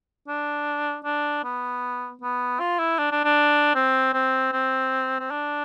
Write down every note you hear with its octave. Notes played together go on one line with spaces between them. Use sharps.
D4
D4
B3
B3
F4
E4
D4
D4
D4
C4
C4
C4
C4
D4